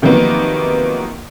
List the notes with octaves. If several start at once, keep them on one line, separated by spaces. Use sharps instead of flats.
C3 D#3 F3 F#3 A#3 B3